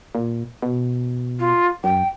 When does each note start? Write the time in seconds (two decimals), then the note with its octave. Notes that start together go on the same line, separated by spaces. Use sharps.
0.15 A#2
0.62 B2
1.39 F4
1.84 F#2 G5